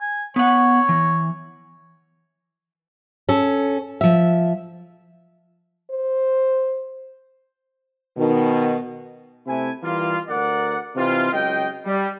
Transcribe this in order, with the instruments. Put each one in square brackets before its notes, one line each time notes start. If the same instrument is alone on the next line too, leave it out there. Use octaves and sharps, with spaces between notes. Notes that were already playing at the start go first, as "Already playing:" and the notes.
[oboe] G#5
[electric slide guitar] B3 F#5 [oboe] C#5
[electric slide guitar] E3
[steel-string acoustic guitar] C#4 A4
F3 E5
[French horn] C5
[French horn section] B2 D#3
[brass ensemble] C3 A3 E4 G#5
E3 G3 A#3 F4
D2 A#4 D5 F#5
C3 E3 D#4 F4
C#2 F#3 D#5 G5
G3